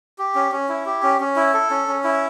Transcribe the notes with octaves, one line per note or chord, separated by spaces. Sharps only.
G4
C#4
C#4
E4
G4
C#4
C#4
E4
A4
C#4
C#4
E4